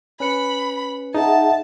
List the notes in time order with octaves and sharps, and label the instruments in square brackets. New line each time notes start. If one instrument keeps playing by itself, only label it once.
[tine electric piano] C#4 B4 C#7 [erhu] B5
[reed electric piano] D#4 [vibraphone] G#4 E5 F#5 [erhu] A5